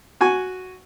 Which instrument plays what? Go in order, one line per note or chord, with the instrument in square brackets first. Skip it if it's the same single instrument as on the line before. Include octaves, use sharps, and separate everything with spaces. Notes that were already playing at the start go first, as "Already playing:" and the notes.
[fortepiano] F#4 G#5 C#6